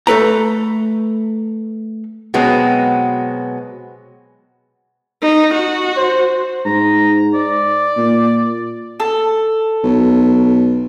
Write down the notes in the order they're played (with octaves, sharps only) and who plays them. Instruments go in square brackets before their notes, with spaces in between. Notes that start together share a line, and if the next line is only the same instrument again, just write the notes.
[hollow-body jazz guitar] A3 A4 B4 A#5
[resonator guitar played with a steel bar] B2 F#3 G#3 B3 C4
[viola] D#4
F#4
[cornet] C5
[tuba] G#2 [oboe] A#5
[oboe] D5
[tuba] A#2
[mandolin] A4
[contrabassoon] B1